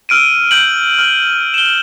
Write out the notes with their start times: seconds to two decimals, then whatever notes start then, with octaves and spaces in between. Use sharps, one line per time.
0.09 E6 F6 D7 D#7
0.51 G6 D7 F#7
0.99 F6
1.54 E7 G7